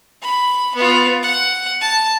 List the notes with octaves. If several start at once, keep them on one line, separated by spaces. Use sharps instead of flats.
B5
B3 F4
F#5
A5